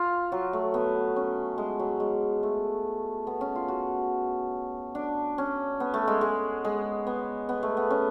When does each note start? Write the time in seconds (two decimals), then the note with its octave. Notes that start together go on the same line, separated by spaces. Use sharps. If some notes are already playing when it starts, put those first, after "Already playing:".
Already playing: F4
0.32 F#3
0.53 A3
0.74 B3
1.16 C#4
1.58 G#3
1.79 F#3
2.00 G#3
2.43 A3
3.27 B3
3.41 C#4
3.56 F4
3.68 F#4
4.95 D4
5.38 C#4
5.80 B3
5.94 A3
6.08 G#3
6.21 G#3
6.65 G#3
7.07 B3
7.49 B3
7.63 A3
7.77 B3
7.91 C#4